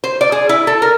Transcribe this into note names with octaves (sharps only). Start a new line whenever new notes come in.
C5
D5
G#4
E4
A4
A#4